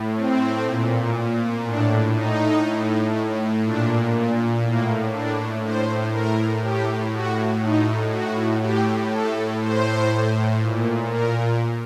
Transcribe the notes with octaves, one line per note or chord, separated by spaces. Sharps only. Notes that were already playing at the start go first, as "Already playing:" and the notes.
Already playing: A2
C4
A#2
A2 D4
D#4
A2
A#2 D4
A2 A#3
D4
A2 C5
A#4
A2 G4
F#4
A2 D#4
F#4
A2 G4
A4
A2 C5
A#2
A#4